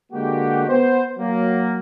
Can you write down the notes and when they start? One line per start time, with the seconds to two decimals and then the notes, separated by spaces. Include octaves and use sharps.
0.12 D3 G#3 A#3 F#4 G4
0.67 B3 C5
1.18 F#3 A#3